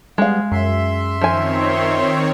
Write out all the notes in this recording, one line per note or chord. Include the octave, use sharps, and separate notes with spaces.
G3 G#3 B3 F5
F#2 E5 C6
D#3 F3 C4 C#5 G#5